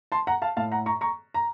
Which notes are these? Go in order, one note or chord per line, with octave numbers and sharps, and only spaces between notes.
A5 C6
F#5 A#5
F5 A5
A2 F5 A5
F#5 A#5
A#5 C#6
A#5 C#6
A#5